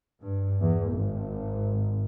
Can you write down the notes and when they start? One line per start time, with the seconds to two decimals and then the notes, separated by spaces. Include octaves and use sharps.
0.21 G2
0.61 E2
0.92 G#1